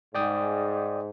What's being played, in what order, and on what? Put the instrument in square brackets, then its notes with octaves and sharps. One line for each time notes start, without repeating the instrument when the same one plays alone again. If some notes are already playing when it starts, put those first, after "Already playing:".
[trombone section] G#2 [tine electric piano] D5 G5 D#6